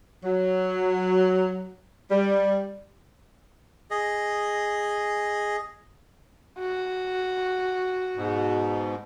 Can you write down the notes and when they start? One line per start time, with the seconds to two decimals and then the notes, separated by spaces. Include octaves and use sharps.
0.24 F#3
2.11 G3
3.91 G#4 D#5
6.59 F#4
8.16 G#2 B2